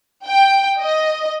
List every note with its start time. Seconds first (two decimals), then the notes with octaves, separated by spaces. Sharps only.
0.25 G5
0.80 D#5